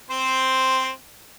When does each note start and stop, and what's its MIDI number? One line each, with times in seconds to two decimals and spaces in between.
0.10 0.90 60
0.10 0.90 72